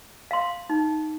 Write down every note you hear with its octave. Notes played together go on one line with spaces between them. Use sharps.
F5 C6
D#4